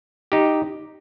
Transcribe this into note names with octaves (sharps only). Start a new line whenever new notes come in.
D#4 G4